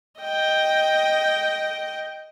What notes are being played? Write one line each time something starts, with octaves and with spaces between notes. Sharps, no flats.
D#5 G5